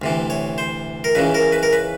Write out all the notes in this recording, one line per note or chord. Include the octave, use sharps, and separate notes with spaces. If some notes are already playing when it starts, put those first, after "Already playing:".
D2 C3 E3
C#5
C5
A#4
C#2 C#3 E3 B4
A#4
B4
A#4
B4